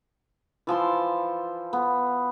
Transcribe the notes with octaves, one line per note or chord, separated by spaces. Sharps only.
E3 F3 A5 C6
B3